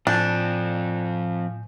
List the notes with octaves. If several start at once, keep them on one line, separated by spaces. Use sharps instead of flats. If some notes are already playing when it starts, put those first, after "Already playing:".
A2 F3 C4 D4 G#5 G6